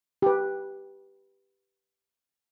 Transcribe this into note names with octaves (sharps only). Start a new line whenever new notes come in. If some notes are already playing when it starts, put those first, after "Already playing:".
G4 B4